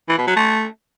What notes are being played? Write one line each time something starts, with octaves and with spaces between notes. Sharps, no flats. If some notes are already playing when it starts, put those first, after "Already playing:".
E3
B2
F#3
A3